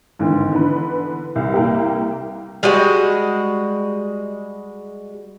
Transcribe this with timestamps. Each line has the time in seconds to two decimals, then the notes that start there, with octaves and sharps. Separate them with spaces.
0.19 G#1 D3 E3
0.51 D3 E3 B3 B4
1.36 C2
1.54 C2 A#3 G4
2.63 G3 G#3 F#4 D#5